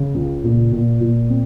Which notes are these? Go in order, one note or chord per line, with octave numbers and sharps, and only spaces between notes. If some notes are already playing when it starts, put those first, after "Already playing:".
Already playing: C#3
C#2
A#2
A#2
A#2
C4